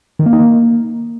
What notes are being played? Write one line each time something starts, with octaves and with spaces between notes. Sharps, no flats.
D#3
A#3
D#4
A#3